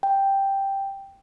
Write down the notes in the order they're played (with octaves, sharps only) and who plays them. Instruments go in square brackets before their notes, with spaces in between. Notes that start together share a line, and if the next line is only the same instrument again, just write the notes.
[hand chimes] G5